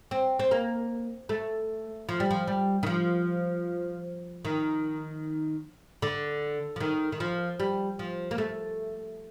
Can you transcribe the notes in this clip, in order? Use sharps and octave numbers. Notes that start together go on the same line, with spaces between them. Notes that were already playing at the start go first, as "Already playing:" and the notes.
C4
C4
A#3
A3
F3
G3
F3
G3
D#3
F3
D#3
D3
F3
D#3
D#3
F3
G3
F3
A#3
A3